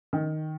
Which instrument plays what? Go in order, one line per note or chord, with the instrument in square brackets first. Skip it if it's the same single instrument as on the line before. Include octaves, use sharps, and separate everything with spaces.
[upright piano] D#3